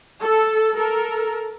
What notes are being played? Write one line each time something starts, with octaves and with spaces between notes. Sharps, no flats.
A4
A4 A#4